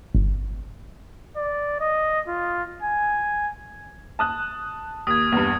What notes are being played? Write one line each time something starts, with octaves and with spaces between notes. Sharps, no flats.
G1
D5
D#5
F4
G#5
A5 D#6 F#6
D#2 D#6 G#6
E2 G2